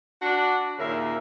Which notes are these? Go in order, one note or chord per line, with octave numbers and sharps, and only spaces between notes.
D4 F#4
D#2 A#2 C#3 A#4 E5